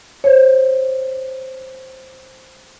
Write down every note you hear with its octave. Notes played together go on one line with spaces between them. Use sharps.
C5 C#5